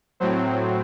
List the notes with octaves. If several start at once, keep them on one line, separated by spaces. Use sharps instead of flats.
A2 F#3 C4